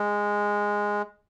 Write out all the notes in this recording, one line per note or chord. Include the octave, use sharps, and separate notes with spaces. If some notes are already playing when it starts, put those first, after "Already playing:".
Already playing: G#3